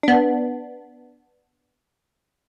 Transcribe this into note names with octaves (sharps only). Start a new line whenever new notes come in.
B3 D4